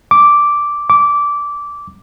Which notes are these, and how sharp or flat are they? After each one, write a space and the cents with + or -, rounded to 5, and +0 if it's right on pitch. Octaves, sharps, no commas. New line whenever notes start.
D6 -5
D6 -15